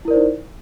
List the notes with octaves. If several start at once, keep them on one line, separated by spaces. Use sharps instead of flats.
D#4 E4 A#4 C5 D5